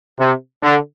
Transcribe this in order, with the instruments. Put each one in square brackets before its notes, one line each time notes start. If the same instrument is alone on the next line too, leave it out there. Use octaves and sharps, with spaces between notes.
[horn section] C3
D3